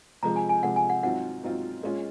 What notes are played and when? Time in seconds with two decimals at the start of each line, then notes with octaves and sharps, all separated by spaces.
0.23 C3 F3 G#3 A#5
0.36 G#5
0.49 G#5
0.63 C3 F3 G#3 F#5
0.76 G#5
0.90 F#5
1.03 G#2 F#3 C4 F4 F#5
1.43 G#2 F#3 C4 F4
1.82 A#2 G#3 C#4 F4